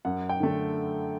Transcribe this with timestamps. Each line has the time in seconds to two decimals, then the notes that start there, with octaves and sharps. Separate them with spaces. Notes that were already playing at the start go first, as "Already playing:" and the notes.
0.05 F#2 F#5
0.29 G5
0.40 D3 A3